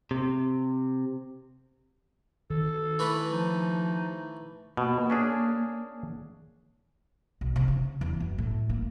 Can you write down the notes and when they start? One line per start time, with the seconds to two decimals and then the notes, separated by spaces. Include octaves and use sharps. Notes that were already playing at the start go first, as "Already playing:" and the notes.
0.11 C3
2.50 D#3 A4
2.99 E3 A3 B4
3.32 F3 D#4
4.77 B2 A#3
5.10 C#4 D4 G#4
7.41 B1
7.56 C3
7.68 C#3
8.01 E2
8.20 F#2
8.38 A2
8.69 A#3